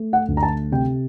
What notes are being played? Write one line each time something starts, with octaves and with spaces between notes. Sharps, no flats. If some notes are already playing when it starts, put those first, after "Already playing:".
Already playing: A3
F#5
D2
A#5
A5
C3 G5